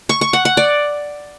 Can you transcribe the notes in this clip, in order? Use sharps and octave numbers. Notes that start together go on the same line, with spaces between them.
C#6
C#6
F#5
F#5
D5